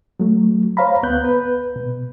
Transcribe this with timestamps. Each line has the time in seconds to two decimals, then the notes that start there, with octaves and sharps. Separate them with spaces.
0.20 F#3 A3
0.77 C5 C#5 F5 A#5 B5
1.03 D2 B3 F#6 G6
1.25 B4
1.76 B2